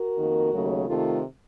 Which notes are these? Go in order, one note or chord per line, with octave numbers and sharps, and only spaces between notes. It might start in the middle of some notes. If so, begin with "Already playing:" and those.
Already playing: F#4 A#4
F2 D#3 A#3
D#2 C#3 F#3 A3
C3 D#3 A3 F4 A4